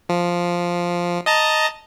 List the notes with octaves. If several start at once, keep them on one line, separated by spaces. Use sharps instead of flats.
F3
D#5 A5 A#5